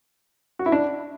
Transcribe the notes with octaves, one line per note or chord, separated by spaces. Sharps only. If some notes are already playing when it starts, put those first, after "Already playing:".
F#4
E4
D4